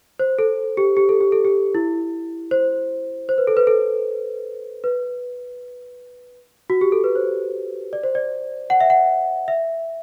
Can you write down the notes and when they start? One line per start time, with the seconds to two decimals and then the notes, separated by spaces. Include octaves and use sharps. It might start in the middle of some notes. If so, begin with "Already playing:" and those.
0.19 C5
0.39 A4
0.77 G4
0.97 G4
1.09 A4
1.21 G4
1.32 A4
1.45 G4
1.75 E4
2.51 C5
3.29 C5
3.38 B4
3.47 A4
3.57 B4
3.67 A4
4.84 B4
6.70 F#4
6.81 G4
6.92 A4
7.04 B4
7.15 C5
7.93 D5
8.04 C5
8.15 D5
8.70 F#5
8.80 E5
8.90 F#5
9.48 E5